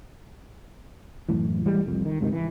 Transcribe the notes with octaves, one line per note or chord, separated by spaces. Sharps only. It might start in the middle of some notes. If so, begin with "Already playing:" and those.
F#2 A2 E3
E3 G3 G#3
C2 F2
D#3
C#2 G#2 C3 D#3
E3